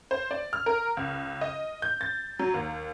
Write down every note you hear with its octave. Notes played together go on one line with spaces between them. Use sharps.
C5
D5
F6
A#4
C#2
D#5
G6
A6
F#3
D#2